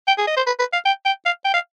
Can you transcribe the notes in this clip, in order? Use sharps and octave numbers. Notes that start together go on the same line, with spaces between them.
G5
G#4
D#5
C5
B4
B4
F5
G5
G5
F5
G5
F5